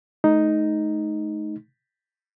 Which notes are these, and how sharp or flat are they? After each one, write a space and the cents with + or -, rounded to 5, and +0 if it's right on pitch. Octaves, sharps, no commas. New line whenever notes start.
A3 -40 D#4 +0